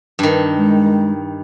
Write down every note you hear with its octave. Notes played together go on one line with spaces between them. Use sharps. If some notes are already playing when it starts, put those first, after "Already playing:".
G2 D#3
G#3